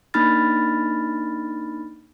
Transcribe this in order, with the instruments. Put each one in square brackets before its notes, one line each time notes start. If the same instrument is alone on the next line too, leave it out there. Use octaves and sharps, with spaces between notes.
[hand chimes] A#3 D4 D#4 B5 F6 A6